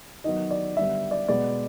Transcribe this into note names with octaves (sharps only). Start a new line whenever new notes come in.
D#3 F#3 B3 D#5
D5
D3 G3 B3 E5
D5
B2 G#3 B3 D5